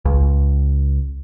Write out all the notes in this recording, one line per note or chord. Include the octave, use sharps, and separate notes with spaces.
C#2